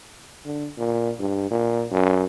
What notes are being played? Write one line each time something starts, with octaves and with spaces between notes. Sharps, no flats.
D3
A#2
G2
A#2
F#2